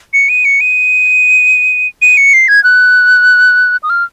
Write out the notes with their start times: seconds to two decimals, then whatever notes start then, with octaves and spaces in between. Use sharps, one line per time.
0.13 C#7
0.29 D#7
0.45 C#7
0.61 D#7
2.02 D#7
2.17 C#7
2.34 C7
2.48 G#6
2.64 F#6
3.83 D#6
3.90 F6